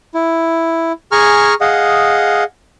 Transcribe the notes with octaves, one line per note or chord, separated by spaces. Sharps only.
E4
G#4 G#5 A#5 C#6 F6
G#4 D#5 F5 F#5